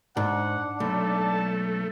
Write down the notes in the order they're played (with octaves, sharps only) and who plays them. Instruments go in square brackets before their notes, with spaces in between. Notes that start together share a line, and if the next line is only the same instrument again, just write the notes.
[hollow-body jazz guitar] G#2 [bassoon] D4 [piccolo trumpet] F#5
[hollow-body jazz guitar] B1 [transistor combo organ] A3 [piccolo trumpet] A5